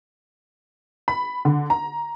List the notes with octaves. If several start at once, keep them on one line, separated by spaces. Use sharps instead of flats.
B5
D3
A#5